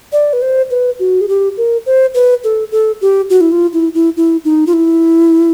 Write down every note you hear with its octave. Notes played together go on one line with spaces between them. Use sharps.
D5
B4
C5
B4
F#4
G#4
G4
A#4
C5
B4
A4
A4
G4
F#4
E4
F4
E4
E4
E4
D#4
F4
E4